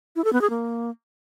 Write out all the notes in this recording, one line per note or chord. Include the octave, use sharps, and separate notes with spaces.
E4
A4
B3
G#4
A#3